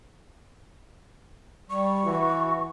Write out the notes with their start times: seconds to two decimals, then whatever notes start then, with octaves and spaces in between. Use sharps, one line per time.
1.70 G3 C#6
2.05 E3 F#4